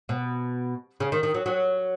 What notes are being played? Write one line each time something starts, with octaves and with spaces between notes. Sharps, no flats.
B2
C#3
D#3
D#3
F#3
F#3